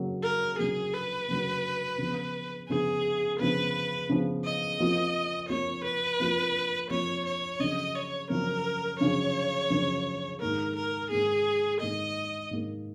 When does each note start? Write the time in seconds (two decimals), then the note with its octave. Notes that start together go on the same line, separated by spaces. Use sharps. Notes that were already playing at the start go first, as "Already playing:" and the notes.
Already playing: C#3 F#3 A#3
0.23 A#4
0.59 C#3 F#3 A#3 G#4
0.94 B4
1.28 C#3 F#3 A#3
1.98 C#3 F3 B3
2.69 C#3 F3 B3 G#4
3.39 C#3 F3 B3 B4
4.09 C#3 F3 B3
4.45 D#5
4.79 F2 F3 A#3 F4
5.49 F2 F3 A#3 F4 C#5
5.85 B4
6.20 F2 F3 A#3 F4
6.90 F2 F3 A#3 F4 C#5
7.26 C#5
7.59 F#2 C#3 F3 D#5
7.95 C#5
8.30 F#2 C#3 F3 A#4
9.00 F#2 C#3 F3 C#5
9.70 F#2 C#3 F3
10.41 G#2 D#3 A#3 A#4
10.76 A#4
11.10 G#2 D#3 A#3 G#4
11.81 G#2 D#3 A#3 D#5
12.51 G#2 D#3 A#3